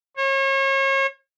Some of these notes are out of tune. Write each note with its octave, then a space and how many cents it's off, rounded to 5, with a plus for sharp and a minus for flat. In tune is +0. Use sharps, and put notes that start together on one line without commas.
C#5 -35